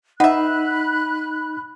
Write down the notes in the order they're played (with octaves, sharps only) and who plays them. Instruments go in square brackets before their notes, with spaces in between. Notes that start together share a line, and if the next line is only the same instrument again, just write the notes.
[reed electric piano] D#4 [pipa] B4 E5 [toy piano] F#5 [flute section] B5 F#6